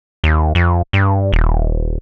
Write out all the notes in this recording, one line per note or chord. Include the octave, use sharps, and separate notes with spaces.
D#2
F2
G2
D#1